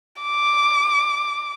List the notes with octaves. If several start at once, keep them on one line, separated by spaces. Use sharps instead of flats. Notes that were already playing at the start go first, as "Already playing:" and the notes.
D6